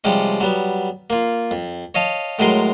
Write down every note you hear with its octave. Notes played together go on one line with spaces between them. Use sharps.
C3 F3 G3 G#3 C#4
F#3 G3 B3
A#3 F4
F2
C#5 D#5 F5 A5
A2 F#3 G#3 G#4 A#4 C6